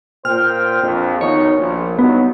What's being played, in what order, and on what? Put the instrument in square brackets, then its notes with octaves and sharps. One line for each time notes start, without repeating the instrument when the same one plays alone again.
[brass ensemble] A#2 C5 G5 [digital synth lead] F6
[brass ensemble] A#1 F2
[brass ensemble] D#2 B2 D#4 [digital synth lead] C#5
[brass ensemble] A#1
[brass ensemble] G2 D#3 F#3 [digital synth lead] B3